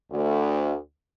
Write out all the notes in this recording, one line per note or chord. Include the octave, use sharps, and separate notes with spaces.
D2